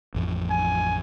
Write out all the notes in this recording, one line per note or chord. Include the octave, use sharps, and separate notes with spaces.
A1 F2 F3
G#5